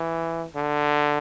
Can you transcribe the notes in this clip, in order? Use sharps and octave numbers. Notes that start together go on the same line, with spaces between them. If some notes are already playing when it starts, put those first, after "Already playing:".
Already playing: E3
D3